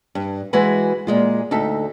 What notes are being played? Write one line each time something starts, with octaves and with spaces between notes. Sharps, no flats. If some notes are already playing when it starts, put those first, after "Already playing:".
G2
E3 G#3 F#4 G#4 B4
A#2 G#3 F4
D2 D#4 A4 E5